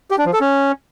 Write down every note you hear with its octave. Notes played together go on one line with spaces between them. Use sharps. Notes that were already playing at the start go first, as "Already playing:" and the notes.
G4
D4
F3
A4
C#4